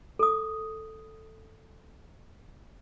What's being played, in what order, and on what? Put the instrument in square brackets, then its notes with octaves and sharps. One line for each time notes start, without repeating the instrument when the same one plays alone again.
[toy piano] A4 D#6